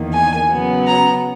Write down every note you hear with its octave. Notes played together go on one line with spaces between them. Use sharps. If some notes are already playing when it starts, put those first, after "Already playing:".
Already playing: E2 D#3 A#3
G#5
C#3 F#3 B3
A#5